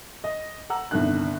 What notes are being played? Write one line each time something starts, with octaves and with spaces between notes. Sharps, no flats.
D#5
F#5 A#5 E6
G1 C2 G2 D3 D#3 F#6